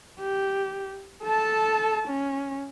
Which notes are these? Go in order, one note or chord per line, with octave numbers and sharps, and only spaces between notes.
G4
A4 A5
C#4